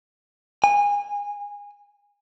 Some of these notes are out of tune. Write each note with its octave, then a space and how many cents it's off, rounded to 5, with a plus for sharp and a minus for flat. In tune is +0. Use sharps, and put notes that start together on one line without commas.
G#5 -25